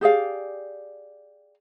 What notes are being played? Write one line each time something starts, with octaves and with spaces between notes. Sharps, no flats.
G4 G#4 D5 F5